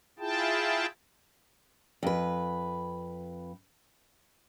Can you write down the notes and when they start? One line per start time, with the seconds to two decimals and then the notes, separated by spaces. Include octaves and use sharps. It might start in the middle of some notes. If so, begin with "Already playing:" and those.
0.19 E4 F4 G#4 G5 A5
2.03 F2 B4